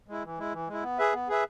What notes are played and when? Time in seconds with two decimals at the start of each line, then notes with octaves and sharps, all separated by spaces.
0.08 G#3 E4
0.24 E3
0.38 G#3 E4
0.53 E3
0.68 G#3 E4
0.83 B3
0.98 G#4 B4 E5
1.13 B3
1.29 G#4 B4 E5